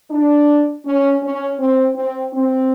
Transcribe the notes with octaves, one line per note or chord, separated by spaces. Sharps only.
D4
C#4
C#4
C4
C4
C4